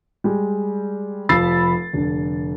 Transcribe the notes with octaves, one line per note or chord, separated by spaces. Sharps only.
G3 G#3
F1 F3 B5 E6 A6 C7
F1 D3